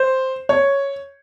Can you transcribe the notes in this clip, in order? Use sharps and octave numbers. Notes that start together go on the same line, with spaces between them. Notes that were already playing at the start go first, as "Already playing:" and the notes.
Already playing: C5
C#5